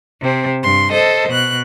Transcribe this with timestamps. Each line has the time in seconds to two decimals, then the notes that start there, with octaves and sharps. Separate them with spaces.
0.20 C3 C4
0.62 G2 C6
0.91 A4 C5 D#5
1.28 B2 F#6